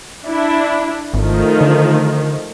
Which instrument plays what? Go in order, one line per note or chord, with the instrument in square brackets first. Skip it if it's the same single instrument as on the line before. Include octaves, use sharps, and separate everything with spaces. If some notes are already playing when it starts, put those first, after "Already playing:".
[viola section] D4 E4
[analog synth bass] G#1 [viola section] D#3 F3 A3
[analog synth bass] D3